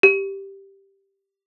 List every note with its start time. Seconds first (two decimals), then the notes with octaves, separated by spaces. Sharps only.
0.03 G4